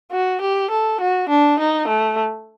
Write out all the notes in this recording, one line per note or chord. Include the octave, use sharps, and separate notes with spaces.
F#4
G4
A4
F#4
D4
D#4
A3